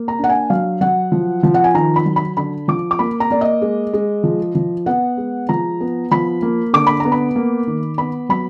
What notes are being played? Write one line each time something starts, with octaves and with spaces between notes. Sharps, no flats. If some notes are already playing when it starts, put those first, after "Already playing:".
Already playing: A#3
A#5
D4
F#5
G#5
F#3 F5
F#3 F#5
F3
F3
F#5
G#5
D#3 A#5
B5
F#3
B5
D3 B5
F3 D6
D6
A#3 B5
A#5
A#3 D5
D#5
G#3
G#3
F3
F3
B3 F#5
G#3
F3 A#5
B3
F3 B5
A#3
D3 D6
B5
B3 A#5
B5
A#3
D#3
B3 B5
F#3 B5